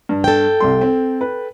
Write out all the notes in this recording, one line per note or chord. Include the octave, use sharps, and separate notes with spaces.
G2
A4 G5
C2 G3 C6
C4
B4